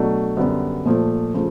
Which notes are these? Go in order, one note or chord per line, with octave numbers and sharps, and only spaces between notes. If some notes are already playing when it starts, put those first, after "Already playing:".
Already playing: B2 F#3 A3 D4
F#2 D3 G3 B3
A#2 F3 A3
C#3 F3 A3